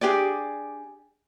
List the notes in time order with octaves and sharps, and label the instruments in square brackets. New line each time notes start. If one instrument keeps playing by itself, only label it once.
[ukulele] D4 G4 G#4 D5